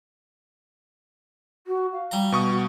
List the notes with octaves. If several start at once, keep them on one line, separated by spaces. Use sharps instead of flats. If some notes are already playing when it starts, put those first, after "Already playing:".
F#4
F5
G3 A#5
B2 C#6 D#6
F#4